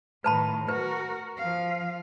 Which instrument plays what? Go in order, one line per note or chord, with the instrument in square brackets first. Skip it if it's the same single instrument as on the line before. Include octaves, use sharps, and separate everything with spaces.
[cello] A2 D#3 [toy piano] B4 A5 B5
[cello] F#4 A#4 [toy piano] B4
[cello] F3 F5